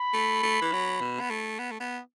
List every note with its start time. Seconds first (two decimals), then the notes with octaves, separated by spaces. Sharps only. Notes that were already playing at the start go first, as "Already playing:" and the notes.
Already playing: B5
0.14 A3
0.43 A3
0.62 E3
0.73 F#3
1.01 B2
1.20 B3
1.30 A3
1.59 B3
1.71 A3
1.80 B3